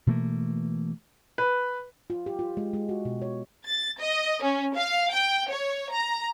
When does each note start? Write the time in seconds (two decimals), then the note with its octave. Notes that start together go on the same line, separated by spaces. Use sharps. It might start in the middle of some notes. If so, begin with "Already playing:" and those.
0.07 B2 E3 A3 A#3
1.38 B4
2.10 F4
2.26 G4
2.39 F4
2.57 G#3
2.73 G#3
2.89 F#4
3.05 B2
3.22 C#5
3.64 A6
4.00 D#5
4.43 C#4
4.74 F5
5.12 G5
5.50 C#5
5.91 A#5